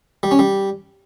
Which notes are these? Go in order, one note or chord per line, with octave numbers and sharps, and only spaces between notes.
G3
C#4
G3